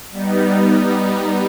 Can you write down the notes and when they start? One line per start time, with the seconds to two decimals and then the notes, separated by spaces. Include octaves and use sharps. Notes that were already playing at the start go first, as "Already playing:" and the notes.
0.12 G3 B3 D#4